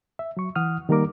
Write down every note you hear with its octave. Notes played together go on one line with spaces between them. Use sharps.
E5
F#3 C#6
E3 F#5 D#6 F6
D#3 G3 A#3 D#4 A#4 D6